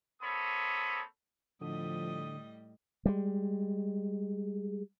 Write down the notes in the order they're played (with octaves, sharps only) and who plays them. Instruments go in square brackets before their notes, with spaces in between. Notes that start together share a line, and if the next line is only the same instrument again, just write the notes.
[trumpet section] A#3 C4 A4 C#5 B5 D#6
[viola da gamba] A2 G3 D#5 [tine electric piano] D3 [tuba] F3 [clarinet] D#6
[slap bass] G3 G#3